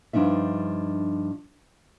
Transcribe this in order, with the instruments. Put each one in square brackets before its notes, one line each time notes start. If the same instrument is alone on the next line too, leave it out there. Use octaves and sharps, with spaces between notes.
[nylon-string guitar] G2 F3 D4 D#4 E5